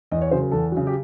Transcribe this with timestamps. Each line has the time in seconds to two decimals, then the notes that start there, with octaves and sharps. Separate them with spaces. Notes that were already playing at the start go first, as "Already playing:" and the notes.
0.11 E2 D#5
0.21 C#5
0.31 C#3 F#3 C5
0.42 A#4
0.52 E2 A4
0.72 C#3 F#3
0.87 G4